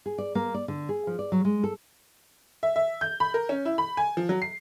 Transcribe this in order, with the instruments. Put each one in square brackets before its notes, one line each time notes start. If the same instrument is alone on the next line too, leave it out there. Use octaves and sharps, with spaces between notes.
[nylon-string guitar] G#4
D5
A#3
D5
D3
G#4
F3
D5
F#3
G#3
A4
[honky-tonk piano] E5
E5
G6
B5
A#4
C#4
E4
B5
G#5
F3
F#3
C7